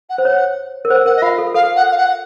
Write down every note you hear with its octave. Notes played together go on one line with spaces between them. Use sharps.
F#5
C5
C#5 F#5
A#4
C5 F#5
A#4 F#5
D#5
F4 F5
A4
A4 F5
F#5
F5
F#5